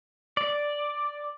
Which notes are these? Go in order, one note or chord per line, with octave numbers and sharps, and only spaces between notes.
D5